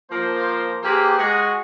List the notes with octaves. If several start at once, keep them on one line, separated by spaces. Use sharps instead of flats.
F3 A#3 C5
A#3 G4 G#4 B4 C5 G5
G#3 F#4 G#4